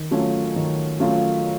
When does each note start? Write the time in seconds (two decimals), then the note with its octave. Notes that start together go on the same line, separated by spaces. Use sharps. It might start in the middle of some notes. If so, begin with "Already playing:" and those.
Already playing: D#3
0.11 F#3 A3 C#4 F4
0.56 D#3
1.00 F#3 A3 C#4 F4